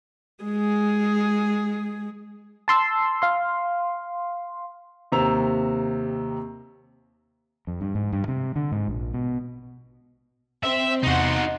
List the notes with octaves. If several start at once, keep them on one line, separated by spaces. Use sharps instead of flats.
G#3 G#4
A5 C6 E6
F5 C6
D#2 C3 A#5 E6 F7
F2
G2
G#2
G2
C3
D3
G#2
A#1
B2
C4 E5
E2 C3 D#4 F#4 F#5 C6